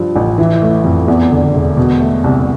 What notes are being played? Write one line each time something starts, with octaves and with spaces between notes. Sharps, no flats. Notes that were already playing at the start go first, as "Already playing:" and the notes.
Already playing: G2 F3
A1
E3
A3
F2
E2
D3
E1
B2
A3
C2